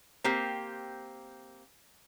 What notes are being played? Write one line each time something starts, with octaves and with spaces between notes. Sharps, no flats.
A#3 C4 G4